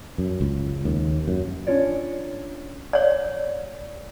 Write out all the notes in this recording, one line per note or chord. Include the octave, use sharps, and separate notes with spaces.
F#2
C#2
D#2
F#2
C#4 D4 F4 C#5 D5
C#5 D5